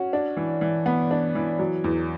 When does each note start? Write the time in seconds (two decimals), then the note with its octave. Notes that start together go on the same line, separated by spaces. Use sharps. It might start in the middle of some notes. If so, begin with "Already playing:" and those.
Already playing: C#4 F#4
0.13 D4
0.37 E3
0.61 E3
0.86 B3
1.11 D4
1.35 E3
1.59 F#3
1.84 E2